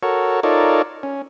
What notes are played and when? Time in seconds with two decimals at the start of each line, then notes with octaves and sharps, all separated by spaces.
0.03 F#4 A4 A#4 C#5
0.43 D#4 F4 A4 A#4 C#5 D5
1.03 C#4